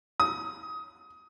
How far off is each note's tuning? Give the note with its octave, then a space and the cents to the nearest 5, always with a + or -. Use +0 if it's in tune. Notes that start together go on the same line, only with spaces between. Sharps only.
D#6 +20